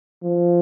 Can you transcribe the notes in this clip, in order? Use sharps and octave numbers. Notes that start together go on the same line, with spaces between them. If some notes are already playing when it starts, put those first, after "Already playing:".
F3